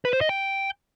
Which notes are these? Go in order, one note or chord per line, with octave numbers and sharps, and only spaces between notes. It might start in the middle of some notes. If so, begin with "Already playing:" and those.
B4
C5
D#5
G5